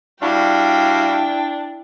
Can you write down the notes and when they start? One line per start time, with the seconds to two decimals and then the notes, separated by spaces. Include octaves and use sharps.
0.23 G3 D4 E4 F#4 F5 G5